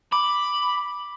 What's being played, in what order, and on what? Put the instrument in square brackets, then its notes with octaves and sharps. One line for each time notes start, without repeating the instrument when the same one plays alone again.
[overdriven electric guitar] B5 [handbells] D6